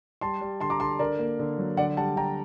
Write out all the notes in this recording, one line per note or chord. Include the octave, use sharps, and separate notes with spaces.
G3 A5 C6
G3
D3 A5 C6
A#5 D6
D3 A5 C6
D3 A#4 D5
A#3
D3
F#3
D3 D5 F#5
G3 F#5 A5
D3 G5 A#5